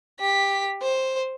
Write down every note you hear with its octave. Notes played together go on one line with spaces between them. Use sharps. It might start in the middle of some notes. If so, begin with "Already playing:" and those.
G4 B6
C5